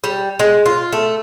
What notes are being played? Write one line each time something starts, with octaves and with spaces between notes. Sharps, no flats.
G3
G#3
F4
A3